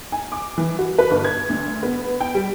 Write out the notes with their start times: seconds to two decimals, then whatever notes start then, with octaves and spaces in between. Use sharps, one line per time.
0.12 G#5
0.32 D6
0.58 E3
0.79 F#4
0.99 B4
1.11 G1
1.24 G#6
1.50 D2
1.83 B3
2.21 G5
2.35 G3